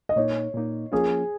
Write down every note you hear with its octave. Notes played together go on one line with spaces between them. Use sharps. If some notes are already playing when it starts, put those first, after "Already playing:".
D#5
A#2 A#3 D#4 C#5
A#2 A#3 D#4
F3 A#3 C#4 F4 G#4